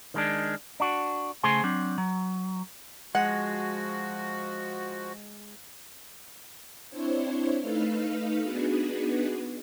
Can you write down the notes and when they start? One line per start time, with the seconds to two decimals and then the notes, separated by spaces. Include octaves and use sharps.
0.14 D#3 G#3 D4
0.80 D4 F#4
1.43 C#3 A3 G#4 C5 G#5 C6
1.63 F#3 C4 D4
1.98 F#3
3.15 F3 G#3 F#4 F#5
6.90 C4 D4 E4 C5 C#5
7.60 A3 D#4 A4 B4 F5 F6
8.42 B3 D4 D#4 F#4 G#4 B4